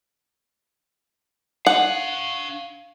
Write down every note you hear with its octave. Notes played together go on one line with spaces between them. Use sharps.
D4 F5 F#5